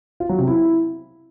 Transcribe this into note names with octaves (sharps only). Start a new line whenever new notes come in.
F4
F#3
C3
E4